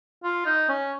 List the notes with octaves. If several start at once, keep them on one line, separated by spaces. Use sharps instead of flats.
F4
D#4
C#4